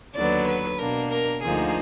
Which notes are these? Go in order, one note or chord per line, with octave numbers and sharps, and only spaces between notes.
D#2 D3 F#3 B3 D5
B4
B2 A#3 D4 A#4
A#4
D2 D3 F3 A#3 D#4 G#4